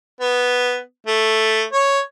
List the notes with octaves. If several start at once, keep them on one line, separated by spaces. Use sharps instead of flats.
B3
A3
C#5